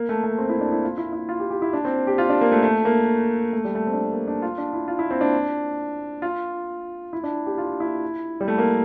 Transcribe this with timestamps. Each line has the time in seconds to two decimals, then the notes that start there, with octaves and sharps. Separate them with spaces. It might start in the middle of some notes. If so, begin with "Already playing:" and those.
Already playing: A#3
0.09 A3
0.24 A3
0.38 C4
0.49 E4
0.61 D4
0.72 E4
0.84 F4
0.98 E4
1.13 E4
1.29 F4
1.40 G4
1.50 G4
1.62 E4
1.73 D4
1.85 C4
2.07 G4
2.18 F4
2.30 D4
2.41 A#3
2.52 A3
2.63 A3
2.85 A#3
3.53 A3
3.65 G3
3.75 A3
3.87 C4
3.93 D4
3.98 C4
4.13 A#3
4.28 D4
4.42 F4
4.58 D4
4.73 E4
4.88 F4
4.99 E4
5.11 C4
5.21 D4
6.22 F4
7.13 E4
7.24 D4
7.46 G4
7.58 F4
7.80 E4
8.41 G3
8.48 A3
8.58 A#3